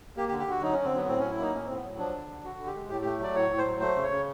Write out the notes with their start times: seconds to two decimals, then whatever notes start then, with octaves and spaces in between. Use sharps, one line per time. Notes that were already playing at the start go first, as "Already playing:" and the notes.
0.16 A#3 G4
0.29 G4
0.32 D3
0.39 G4
0.47 D3 F#4
0.62 F#3 D#4
0.73 D3 C#4
0.85 C4
0.93 F#3 B3
1.07 A2 C4
1.19 F#3 C#4
1.31 E4
1.38 A#3 D#4
1.54 A2 C#4
1.65 A2 C4
1.76 B3
1.84 F#3
1.98 F3 D4
2.15 D3
2.29 D3
2.44 D3 F#4
2.59 D3
2.67 G4
2.75 G#3
2.89 A2 G4
3.02 A3 G4
3.20 F#3 D5
3.35 A2 C#5
3.51 A2
3.58 C5
3.66 F#3
3.80 A3 C5
3.96 C#3
4.04 C#5
4.11 C#3